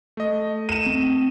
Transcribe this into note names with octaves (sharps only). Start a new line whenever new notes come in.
A3 D#5
D#7 E7
C4